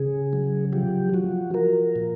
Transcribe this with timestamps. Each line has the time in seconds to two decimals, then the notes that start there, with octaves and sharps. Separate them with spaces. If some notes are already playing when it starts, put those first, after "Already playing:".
Already playing: C#3 G#4
0.33 F#3
0.73 F3 G4
1.14 F3 F#4
1.54 F3 A#4
1.96 A#2